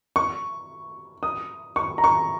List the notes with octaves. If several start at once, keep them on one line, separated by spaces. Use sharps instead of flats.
C#6
D#6
C#6
A#5
C#6